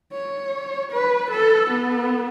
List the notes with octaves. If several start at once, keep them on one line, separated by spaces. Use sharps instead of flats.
C#5
B4
A4
B3